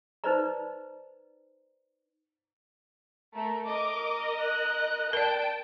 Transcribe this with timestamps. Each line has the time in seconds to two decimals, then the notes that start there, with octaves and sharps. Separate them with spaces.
0.24 D#4 B4 C5 D5 A#5
3.34 A3 A#4
3.66 A#4 D#5 D6
4.40 F#6
5.13 A#4 D5 G5 A5 D7